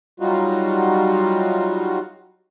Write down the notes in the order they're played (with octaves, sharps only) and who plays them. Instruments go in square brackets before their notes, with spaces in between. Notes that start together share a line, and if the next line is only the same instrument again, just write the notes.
[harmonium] F#3 G3 D#4 F4 F#4